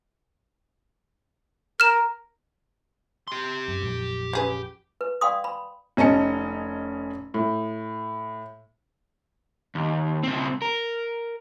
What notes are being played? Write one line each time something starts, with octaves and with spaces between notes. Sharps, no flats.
A#4 F6 E7
G4 C6
F#2
A#1 F2 F#3
C#3 G#4 B4
B4
D5 F5 G5 C6 D#6
B5 C6
F1 C#4 D#5 A5 C#7
A2
D#2
C#2 C4
A#4